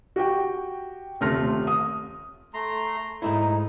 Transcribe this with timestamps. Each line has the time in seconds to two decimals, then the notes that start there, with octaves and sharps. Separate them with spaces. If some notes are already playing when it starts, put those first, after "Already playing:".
0.16 F#4 G4 G5
1.21 D#1 C3 A3 C6 F6 A#6
1.67 D#6
2.54 A3 A#5 C6
3.22 G#2 A3 D#4 E4